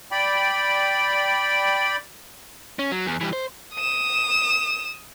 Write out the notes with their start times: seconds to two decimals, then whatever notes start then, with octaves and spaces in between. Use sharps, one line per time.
0.12 D5 G5 B5
2.79 C#4
2.91 F#3
3.06 E2
3.21 E3 G3
3.33 C5
3.75 D#6 E7